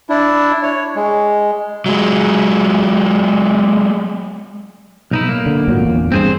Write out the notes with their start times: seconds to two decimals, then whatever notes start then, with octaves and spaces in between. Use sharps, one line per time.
0.09 D4 E4
0.63 C#5
0.96 G#3
1.86 F#3 G#3
5.11 B1 D#4 E4
5.29 A#3
5.46 D3
5.68 G#1 A#2 F#3
5.82 E2 A#2
6.12 G2 C4 G#4 C5